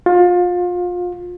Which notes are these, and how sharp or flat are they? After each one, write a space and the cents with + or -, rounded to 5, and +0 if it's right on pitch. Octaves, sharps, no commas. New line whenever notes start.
F4 +30